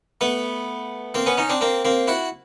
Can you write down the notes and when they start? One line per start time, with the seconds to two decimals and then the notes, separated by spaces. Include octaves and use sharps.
0.21 A3 B3
1.14 A#3 C4
1.26 B3 C#4
1.37 C#4 D#4
1.49 C4 D4
1.61 A#3 C4
1.85 A#3 C4
2.07 E4 F#4